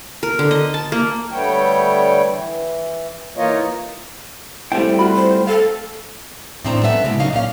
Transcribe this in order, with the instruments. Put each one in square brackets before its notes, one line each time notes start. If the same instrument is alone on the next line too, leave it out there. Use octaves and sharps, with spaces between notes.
[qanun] A#4
D3
D#5
A5
A#3
[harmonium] D3 G3 A3 B3 C#5 G5
E3
E3 A#3 D#4 F4 C#5 D#5
[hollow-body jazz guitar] G3 C4 E4 [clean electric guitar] A3 G5
[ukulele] F4 F#4 B5
[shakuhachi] C5
[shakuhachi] A4 [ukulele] F5
[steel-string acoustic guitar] A2 D#3 C4 D4 A#5
A3 B3 C#4 E5
A#2 C#3 G#3 E4
F#3 A#3 D#4 F5
A#2 C#4 F5